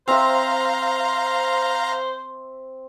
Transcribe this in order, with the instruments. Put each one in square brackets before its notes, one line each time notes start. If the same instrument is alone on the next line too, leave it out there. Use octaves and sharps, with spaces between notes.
[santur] C4 E5 [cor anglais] C5 [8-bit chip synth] F5 A#5